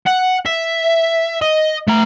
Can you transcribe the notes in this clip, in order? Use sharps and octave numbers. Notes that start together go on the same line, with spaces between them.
F#5
E5
D#5
A3 A#5